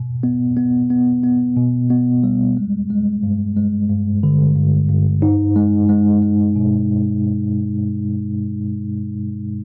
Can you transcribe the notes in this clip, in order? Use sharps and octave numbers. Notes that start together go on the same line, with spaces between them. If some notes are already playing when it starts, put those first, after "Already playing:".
Already playing: B2
B3
B3
B3
B3
B2
B3
G3
G#3
G#3
G2
G#3
G2
D3
G2
G2
D#4
G#3
G#3
G#3
B2